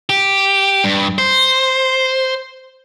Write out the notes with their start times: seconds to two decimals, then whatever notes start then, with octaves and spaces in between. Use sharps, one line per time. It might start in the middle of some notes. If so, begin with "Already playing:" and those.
0.09 G4
0.84 G2
1.18 C5